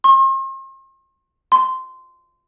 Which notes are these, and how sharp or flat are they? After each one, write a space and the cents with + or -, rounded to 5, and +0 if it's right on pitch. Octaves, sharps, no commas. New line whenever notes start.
C6 +45
C6 -15